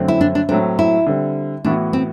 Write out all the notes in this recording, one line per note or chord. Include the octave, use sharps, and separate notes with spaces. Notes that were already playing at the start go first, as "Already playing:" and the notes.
Already playing: F#2 D3 A3 C4
E4
D4
D4
A2 F#3 A3 C4 D4
E4
D3 G3 C4
A2 E3 B3 D4 F#4
C4